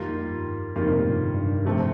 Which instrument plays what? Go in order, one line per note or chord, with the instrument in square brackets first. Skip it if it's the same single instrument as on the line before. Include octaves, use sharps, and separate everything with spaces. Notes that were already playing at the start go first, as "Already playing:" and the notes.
Already playing: [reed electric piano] F2 [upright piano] D#3 G3 A#3 F4
[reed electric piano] G2
[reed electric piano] F2 [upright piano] D#3 G3 A#3 F4
[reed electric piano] C3
A#2
A2
G2
G2
[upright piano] F2 C3 F3 A3 C4